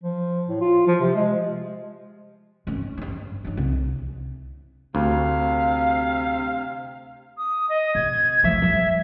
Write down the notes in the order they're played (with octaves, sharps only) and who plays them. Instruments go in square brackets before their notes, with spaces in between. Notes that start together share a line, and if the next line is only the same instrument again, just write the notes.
[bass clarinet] F3
A2
F4
F3
C3
G#3
[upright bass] G#1 C#4
G2 D#4
F#3 D#4
C2
[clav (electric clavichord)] D2 [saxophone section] C3 F5
[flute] D#6
D#5
[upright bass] C3 [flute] G#6
[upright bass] F3 A3 [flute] E5
[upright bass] F3 G3